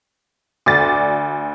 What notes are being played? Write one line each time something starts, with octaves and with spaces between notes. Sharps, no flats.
D2 D5 A6